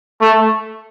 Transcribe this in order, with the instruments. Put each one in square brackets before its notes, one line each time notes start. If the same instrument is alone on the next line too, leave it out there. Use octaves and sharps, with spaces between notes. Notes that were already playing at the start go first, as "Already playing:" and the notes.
[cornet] A3